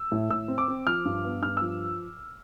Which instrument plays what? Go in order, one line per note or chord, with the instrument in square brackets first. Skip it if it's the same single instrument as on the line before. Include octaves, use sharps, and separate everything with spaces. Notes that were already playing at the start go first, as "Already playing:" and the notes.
Already playing: [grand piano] E6
A2
A2 E6
C4
D6
C4
F3 F6
G2
B3
G2 F6
F3 E6